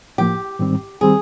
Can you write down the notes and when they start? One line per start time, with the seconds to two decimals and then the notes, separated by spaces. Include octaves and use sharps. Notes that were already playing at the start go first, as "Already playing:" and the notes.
0.18 A2 F3 A#3 G4
0.59 G#2 D#3 G3 C4
1.01 D#3 G3 C4 G#4